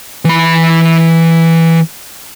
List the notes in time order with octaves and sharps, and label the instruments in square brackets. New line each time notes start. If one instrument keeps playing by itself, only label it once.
[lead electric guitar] E3 B5